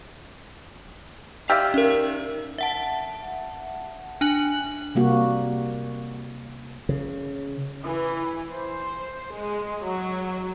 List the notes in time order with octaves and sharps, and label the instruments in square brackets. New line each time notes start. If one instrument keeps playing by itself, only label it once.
[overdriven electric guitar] D#4 F5 [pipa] G4 D5 E5 [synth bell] E6 F6 B6
[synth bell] C#4 A#4
E5 F#5 A5
D4 G#5 F#6 F#7
[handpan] C3 G3 A#3 F#4
[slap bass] C#3
[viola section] E3
C5
G#3
F#3